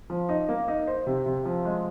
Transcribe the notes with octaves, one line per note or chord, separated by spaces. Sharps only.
F3
D#4
A#3
D#4
C5
C3
C3
F3
G#3